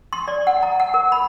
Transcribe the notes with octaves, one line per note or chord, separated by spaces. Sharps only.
C6
D5
F#5
A#5
F#5
A#4
B5